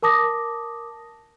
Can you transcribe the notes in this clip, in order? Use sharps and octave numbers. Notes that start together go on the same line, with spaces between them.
A#4 A5 D6 D#6 A#6